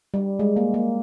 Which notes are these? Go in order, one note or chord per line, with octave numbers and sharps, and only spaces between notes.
G3
G#3
A#3
A#3